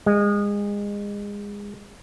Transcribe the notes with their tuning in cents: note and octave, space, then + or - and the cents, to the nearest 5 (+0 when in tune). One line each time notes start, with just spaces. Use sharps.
G#3 -30